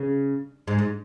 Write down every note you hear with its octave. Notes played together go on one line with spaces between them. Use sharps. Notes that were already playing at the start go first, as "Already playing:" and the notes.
Already playing: C#3
G#2
G#2